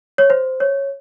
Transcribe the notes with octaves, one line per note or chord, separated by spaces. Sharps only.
C#5
C5
C#5